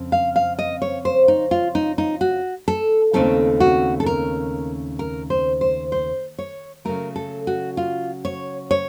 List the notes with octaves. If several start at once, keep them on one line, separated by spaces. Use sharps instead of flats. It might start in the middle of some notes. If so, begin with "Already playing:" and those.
Already playing: F2 C#3 C4
F5
F5
D#5
C#5
C5
D#4
F4
D#4
D#4
F#4
A4
D#2 C#3 A3 C4 D#4 A4
F#4
A4
A#4
A#4
C5
C5
C5
C#5
C#3 F#3 A3 A#4
A4
F#4
F4
C#5
C#5